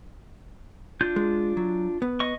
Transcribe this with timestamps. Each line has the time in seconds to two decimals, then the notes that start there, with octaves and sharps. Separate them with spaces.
1.01 D4 F4 G6
1.16 G#3
1.57 F#3
2.02 B3
2.20 D#5 C#6